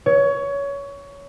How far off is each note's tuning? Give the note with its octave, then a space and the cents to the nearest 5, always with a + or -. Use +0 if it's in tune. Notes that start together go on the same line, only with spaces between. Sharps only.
C#5 +20